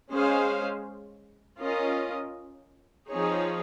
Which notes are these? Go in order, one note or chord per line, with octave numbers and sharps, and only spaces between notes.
G#3 C#4 G#4 C5 F5
C#4 F4 A#4 D#5
F3 C4 D#4 G#4 C#5